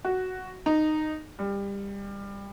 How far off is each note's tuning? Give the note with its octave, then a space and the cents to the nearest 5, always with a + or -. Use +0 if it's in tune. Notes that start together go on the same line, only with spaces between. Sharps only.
F#4 +5
D#4 -10
G3 +25